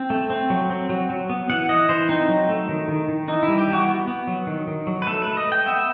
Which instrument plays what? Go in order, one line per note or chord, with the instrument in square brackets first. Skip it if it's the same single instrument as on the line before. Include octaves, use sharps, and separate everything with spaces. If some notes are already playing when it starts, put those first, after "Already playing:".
Already playing: [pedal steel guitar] C4
A3
C4
F#3
C4
F#3
F#3
B3
E3 F#5
E3 D#5
E3 C5
C4 D#4
F#3
A3
D#3
D#3
D#3
E3 D#4
E4
G3
G4
E3
F#4
B3
B3
F#3
D#3
D#3
F#3
B4
A3 A4
B4
A3
D#5
A3 G5
B3 E5